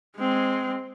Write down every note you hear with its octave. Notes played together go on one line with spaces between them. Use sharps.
G#3 C4